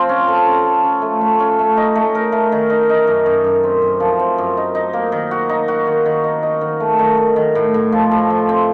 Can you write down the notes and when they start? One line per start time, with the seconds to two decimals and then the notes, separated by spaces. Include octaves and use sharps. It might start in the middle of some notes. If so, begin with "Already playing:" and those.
Already playing: F3 C4 F4
0.09 C#4
0.28 A4
0.46 C#4
0.66 A4
0.84 C#4
1.02 A3
1.21 A3
1.40 C#4
1.59 A3
1.77 D#4
1.96 A3
2.15 A#4
2.32 A3
2.52 D#3
2.70 D#4
2.89 D#4
3.07 F#2
3.26 F#2
3.44 F#2
3.63 C4
3.82 F#2
4.00 F3
4.19 C4
4.38 F#2
4.57 D#4
4.75 D#4
4.93 A#3
5.12 D#3
5.31 F#4
5.49 D#4
5.68 F#4
5.87 D#3
6.06 D#3
6.24 D#4
6.43 D#4
6.61 D#3
6.80 A3
6.99 D#3
7.17 D#3
7.36 D#3
7.55 A2
7.74 A2
7.92 F3
8.11 A2
8.30 F3
8.49 C4